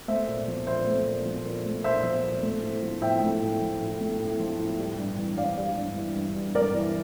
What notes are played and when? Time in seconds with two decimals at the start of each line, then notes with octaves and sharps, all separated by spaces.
0.08 A3 C5 E5
0.27 A#2
0.48 F3
0.67 A#2 C5 E5
0.87 A3
1.06 A#2
1.26 F3
1.45 A#2
1.65 A3
1.84 A#2 C5 E5
2.04 F3
2.23 A#2
2.43 A3
2.63 A2
2.83 F3
3.02 A2 E5 G5
3.21 A3
3.42 A2
3.61 F3
3.81 A2
4.01 A3
4.20 A2
4.39 F3
4.59 A2
4.79 G3
4.98 G2
5.18 E3
5.37 G2 D5 F5
5.58 G3
5.76 G2
5.96 E3
6.16 G2
6.35 G3
6.55 G2 A#4 D5
6.74 E3